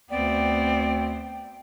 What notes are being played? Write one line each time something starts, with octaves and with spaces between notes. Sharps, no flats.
D2 B3 C4 D5 G5